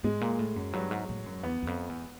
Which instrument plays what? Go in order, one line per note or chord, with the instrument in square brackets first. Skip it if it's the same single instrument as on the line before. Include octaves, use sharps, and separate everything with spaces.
[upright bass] G#2 [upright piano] G#3
[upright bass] A#2
A2
F#2
[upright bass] G2 [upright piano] F#3
[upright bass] G#2
A2
F#2
[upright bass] E2 [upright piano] B3
[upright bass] E2
F2
E2